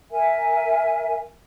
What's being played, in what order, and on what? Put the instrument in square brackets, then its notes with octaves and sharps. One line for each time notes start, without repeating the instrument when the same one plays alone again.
[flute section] A#4 E5 G#5